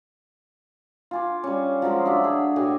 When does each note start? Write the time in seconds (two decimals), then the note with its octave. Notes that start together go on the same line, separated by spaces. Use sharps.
1.11 F4 G#5 D6
1.44 G3 C#4
1.82 F3 F#3 G#3 F4
2.06 D4 F#4 E5
2.24 G#4
2.56 A2 F#4 G4 G#5